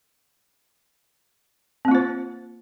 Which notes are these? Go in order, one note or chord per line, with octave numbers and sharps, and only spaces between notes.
A#3 C4 F4 C5